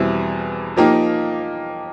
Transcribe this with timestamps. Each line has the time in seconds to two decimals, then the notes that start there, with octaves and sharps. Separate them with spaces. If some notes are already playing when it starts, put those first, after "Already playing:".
Already playing: E2 B2 G3 C4 E4
0.76 F3 A#3 D#4 G4